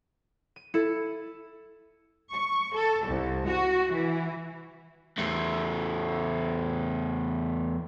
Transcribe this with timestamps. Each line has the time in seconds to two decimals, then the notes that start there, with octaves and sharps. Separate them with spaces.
0.56 D#7
0.74 E4 A4 C#7
2.31 C#6
2.74 A4
3.05 C2
3.46 F#4
3.91 E3
5.18 E2 A3